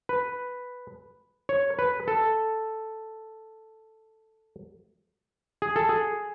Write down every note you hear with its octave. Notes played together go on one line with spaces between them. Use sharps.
B4
C#5
B4
A4
G#4
A4
G#4